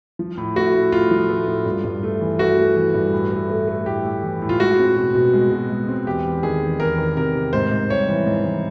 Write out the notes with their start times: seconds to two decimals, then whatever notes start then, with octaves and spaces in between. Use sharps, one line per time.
0.19 F3
0.37 A2
0.56 A3 F#4
0.74 A2
0.92 A2 F4
1.11 F3
1.29 A3
1.47 A2
1.65 G2
1.84 G2
2.03 A3
2.21 E3
2.39 A3 F#4
2.58 A3
2.76 E3
2.94 G2
3.13 A2
3.31 A3
3.50 A3
3.68 A3
3.86 A2 G4
4.04 A2
4.23 E3
4.42 A2
4.49 F4
4.60 G#3 F#4
4.79 C4
4.96 B2
5.15 B2
5.33 G#3
5.51 B2
5.70 G#3
5.88 C4
6.07 E2 G4
6.25 E2
6.43 D#3 G#4
6.62 E2
6.79 E2 A#4
6.98 D#3
7.17 C3 A#4
7.35 C3
7.53 G#2 C5
7.71 G#2
7.90 G3 C#5
8.09 E3
8.26 G#2
8.45 E3